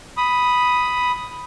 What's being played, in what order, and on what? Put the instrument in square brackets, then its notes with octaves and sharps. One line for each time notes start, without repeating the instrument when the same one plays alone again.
[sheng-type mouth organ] B5 D#6